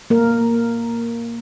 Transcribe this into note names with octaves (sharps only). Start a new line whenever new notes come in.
A#3 A#4